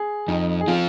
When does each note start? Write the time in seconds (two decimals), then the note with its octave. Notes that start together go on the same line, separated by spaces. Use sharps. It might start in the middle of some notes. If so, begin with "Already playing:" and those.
Already playing: G#4
0.28 F2 D#4
0.61 G#4
0.67 F3 C4 F4